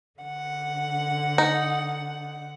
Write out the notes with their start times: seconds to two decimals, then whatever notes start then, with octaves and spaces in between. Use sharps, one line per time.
0.20 D3 F#5
1.38 D#4